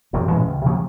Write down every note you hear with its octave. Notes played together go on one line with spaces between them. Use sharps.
E1 F#2 A2 C3
A#2 E3 G#3 C#4
C#2
C3 F3 F#3 A#3